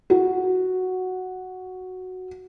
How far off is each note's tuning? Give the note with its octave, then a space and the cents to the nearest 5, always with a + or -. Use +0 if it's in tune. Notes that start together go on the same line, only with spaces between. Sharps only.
F#4 +0